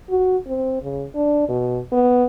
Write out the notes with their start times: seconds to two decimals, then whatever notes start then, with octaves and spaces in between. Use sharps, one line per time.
0.10 F#4
0.47 C4
0.82 C#3
1.15 D4
1.49 B2
1.92 B3